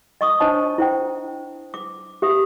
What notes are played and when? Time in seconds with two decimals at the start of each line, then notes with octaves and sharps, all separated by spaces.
0.21 D#5 C#6 D#6
0.40 D4 C5 C#5 D#5 A5
0.78 E4 C5 G5
1.74 D6
2.22 G4 E5 D#6